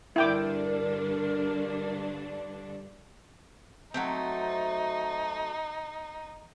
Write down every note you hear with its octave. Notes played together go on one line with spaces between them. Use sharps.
G2 D3 D4 E4 A#4 G5 D6
F#3 A3 C4 D#4